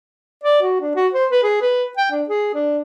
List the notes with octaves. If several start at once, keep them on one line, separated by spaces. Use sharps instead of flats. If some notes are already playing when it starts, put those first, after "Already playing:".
D5
F#4
D4
F#4
C5
B4
G#4
B4
G5
D4
G#4
D4